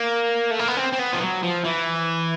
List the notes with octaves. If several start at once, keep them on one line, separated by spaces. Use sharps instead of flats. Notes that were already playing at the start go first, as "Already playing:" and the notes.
Already playing: A#3
A3
A#3
B3
C4
C4
B3
F3
F#3
F3
E3